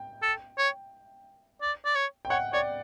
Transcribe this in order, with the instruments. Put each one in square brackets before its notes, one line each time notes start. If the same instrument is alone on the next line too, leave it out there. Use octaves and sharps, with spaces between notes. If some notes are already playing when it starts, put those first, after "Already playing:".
Already playing: [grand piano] G5
[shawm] A4
C#5
D5
D5
C#5
[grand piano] G5
[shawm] C#5 [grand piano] F#5
[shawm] C#5 [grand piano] D5